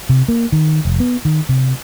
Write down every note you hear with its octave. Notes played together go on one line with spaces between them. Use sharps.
C3
A#3
D#3
F1
B3
D#3
C3